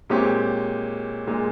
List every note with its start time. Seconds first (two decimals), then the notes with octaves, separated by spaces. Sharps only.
0.10 A#2 G#3 C4 G4 C#5
1.27 A#2 G#3